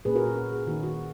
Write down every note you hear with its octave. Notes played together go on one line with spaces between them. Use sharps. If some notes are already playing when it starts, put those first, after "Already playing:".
A#2 A#3 C#4 G#4 B4
F#4 A#4
F#4
F#4
G#4
D#3 A#3 D#4 F#4
F#4